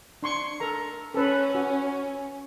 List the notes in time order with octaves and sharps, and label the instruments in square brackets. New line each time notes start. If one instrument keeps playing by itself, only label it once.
[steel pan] D4 C6 C#6
A4 A#4 A#5
[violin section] C#4 [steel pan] A4 B4
[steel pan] F#4